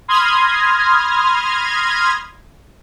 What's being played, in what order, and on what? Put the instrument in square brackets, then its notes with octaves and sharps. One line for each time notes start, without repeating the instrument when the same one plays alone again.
[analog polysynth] B5 C6 D#6 F6 G#6 A#6